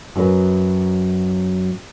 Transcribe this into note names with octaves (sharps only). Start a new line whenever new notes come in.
F#2 F#3 B4